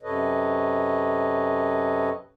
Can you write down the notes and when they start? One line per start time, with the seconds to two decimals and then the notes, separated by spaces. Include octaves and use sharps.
0.03 F#2 C3 A4 B4 C#5 D#5